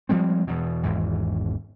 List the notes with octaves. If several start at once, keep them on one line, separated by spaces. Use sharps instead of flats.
F3 G3 G#3 C4
E2 B2
G#1 E2 G#2 E3